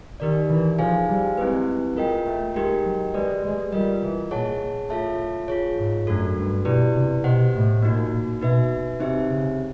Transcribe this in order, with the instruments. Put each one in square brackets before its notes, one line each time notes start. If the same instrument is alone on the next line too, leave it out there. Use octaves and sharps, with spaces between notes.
[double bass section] D#3 [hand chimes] D#4 G4 A#4 D5
[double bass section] E3
[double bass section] F3 [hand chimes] D#4 G#4 C5 F5 G#5
[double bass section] G3
[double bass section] G#3 [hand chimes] C4 E4 G4 B4
[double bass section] G#3 [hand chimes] F4 A#4 D#5 G5
[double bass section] A3
[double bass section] G#3 [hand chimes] D#4 G4 A#4 D#5 G5
[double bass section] F#3
[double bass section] G#3 [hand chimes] G4 B4 D5
[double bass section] G#3
[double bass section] G3 [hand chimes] F4 A#4 D#5
[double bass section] E3
[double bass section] A#2 [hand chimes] G#4 C#5 F#5 A5
[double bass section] A2 [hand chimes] F4 A4 C#5 E5 A5
[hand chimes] F4 G#4 C#5
[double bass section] G#2
[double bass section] F#2 [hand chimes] A3 D4 F#4 A4
[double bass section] G2
[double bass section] B2 [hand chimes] E4 G4 B4 D5
[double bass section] C3
[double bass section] B2 [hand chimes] G4 C5 D#5 F#5
[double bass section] A2
[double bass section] A#2 [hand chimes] A#3 D#4 F#4
[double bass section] B2 [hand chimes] D#4 F#4 B4 E5
[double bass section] C3 [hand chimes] C4 D#4 G4 C5 E5
[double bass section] C#3